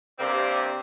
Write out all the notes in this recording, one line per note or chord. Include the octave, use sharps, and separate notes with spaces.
G2 C3 A#3 C4 A#4 D5